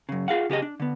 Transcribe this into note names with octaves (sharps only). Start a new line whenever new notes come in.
F#2 C#3
F4 G#4 F5 F#5
C#3 G4 G#4 D#5
D4
D3 B3